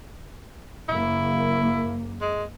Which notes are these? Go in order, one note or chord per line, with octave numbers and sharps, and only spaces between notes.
F#1 A#3 E4
G#3